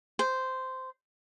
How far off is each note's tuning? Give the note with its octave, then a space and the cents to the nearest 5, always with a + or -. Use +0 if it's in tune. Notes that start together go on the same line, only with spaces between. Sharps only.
C5 -10